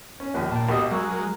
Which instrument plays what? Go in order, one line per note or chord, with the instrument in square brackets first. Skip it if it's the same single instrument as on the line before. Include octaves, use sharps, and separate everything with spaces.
[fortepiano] C#4
A#1 D#2
[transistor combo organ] A#2 [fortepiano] G5 A5
[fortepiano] B1 G4 D#5
[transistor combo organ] F#3 G#3 [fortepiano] A#4 C#6 E6
[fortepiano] A#4